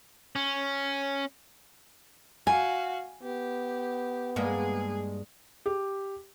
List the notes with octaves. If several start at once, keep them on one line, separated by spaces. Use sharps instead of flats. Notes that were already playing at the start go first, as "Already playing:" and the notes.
C#4
F#4 F5 G#5
B3 G4
G2 G#3 A#3 G#4
G4